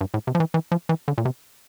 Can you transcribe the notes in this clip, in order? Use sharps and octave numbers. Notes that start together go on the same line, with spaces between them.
G2
A2
C3
F3
E3
E3
F3
E3
D3
A#2
C3